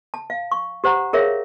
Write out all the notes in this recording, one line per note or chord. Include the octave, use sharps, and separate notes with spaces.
A5
F5
C#6
G4 C5 F#5 A#5
G#4 A#4 C#5 E5 F5